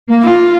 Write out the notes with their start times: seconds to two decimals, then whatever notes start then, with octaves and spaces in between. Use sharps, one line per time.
0.09 A#3
0.23 F4